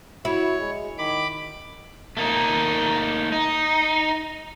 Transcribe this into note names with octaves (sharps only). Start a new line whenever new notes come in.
E4 F#4 C#5
G#3
D#3 B5 D6
A3 A#3 D#4
D#4